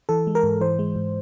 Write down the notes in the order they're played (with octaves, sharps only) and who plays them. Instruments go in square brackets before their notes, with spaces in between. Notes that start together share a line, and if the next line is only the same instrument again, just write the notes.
[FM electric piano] E3 A4
G#3
A#4
G#2
E3 C5
G#3
G#2